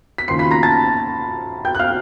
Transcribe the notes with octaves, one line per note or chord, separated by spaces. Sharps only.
B6
D#2 C#3 F3 C6 C7
B5 B6
A#5 A#6
A5 A6
G5 G6
F#6
F5 F6